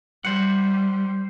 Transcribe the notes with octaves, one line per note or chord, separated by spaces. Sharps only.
G3 C5 F#5